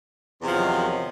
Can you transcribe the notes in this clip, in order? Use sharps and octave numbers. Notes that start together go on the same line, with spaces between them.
E2 C3 D#3 F3 F#3